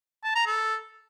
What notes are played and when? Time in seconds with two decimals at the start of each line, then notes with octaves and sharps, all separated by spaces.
0.24 A5
0.35 A#5
0.46 A4